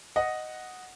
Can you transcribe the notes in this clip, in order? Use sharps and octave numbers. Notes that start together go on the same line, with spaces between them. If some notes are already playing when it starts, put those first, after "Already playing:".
D#5 F#5